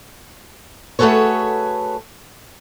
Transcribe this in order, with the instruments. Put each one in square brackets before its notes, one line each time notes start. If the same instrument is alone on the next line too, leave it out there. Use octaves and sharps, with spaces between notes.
[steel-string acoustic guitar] A3 F#4 G#4 A4 B4 C#5